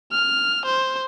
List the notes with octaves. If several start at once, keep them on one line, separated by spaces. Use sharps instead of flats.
F6
C5